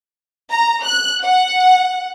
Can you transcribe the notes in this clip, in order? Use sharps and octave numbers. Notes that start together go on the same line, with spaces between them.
A#5
F#6
F#5